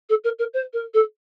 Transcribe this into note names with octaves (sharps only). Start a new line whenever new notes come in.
A4
A#4
A#4
C5
A#4
A4